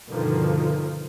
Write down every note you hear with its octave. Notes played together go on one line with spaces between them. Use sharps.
G2 B2 D3 D#3 F3